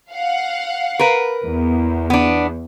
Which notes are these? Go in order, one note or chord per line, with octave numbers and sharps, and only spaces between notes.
F5 F#5
A#4 B4
E2
B3 D4